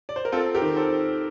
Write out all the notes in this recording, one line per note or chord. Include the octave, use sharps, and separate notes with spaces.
D5
C5
A#4
C4 F4 A4
G4 A#4
D#3
A4 C5